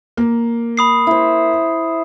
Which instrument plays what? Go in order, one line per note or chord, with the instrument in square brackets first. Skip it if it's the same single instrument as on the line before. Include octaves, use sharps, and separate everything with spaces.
[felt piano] A#3
[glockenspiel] B5 D#6 C7
[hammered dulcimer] E4 C5